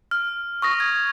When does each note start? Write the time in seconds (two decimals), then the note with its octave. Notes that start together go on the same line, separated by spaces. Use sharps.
0.11 F6
0.62 C#6 D#6 A#6
0.80 G#6